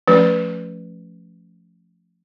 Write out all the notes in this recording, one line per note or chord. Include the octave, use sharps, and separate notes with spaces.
F3 A3 C#4 B4